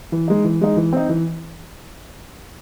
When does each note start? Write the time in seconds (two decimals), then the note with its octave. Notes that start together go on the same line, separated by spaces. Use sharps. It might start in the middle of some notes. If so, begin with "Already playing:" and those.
0.12 E3
0.28 G#3 D#4
0.44 E3
0.61 G#3 D#4
0.77 E3
0.93 C4 D#4
1.09 E3